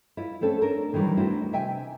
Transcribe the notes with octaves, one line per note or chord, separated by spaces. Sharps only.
E4 F4
A3 C4 C#4 A4
C#4 D4 A#4
A#2 D#3 E3 F#3 G3
A3 C4 D4 E4 F#4
C3 E5 G5 G#5